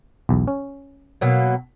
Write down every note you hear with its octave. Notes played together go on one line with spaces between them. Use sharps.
B1 E2
C#4
B2 F#3 A#3